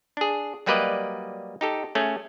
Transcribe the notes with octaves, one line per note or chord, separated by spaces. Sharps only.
D4 G#4
F#3 G3 A#3 B4 D5 D#5
D#4 G4 A4
A3 C#4 G#4